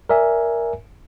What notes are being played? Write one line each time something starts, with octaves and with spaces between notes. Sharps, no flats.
A#4 D5 E5 G#5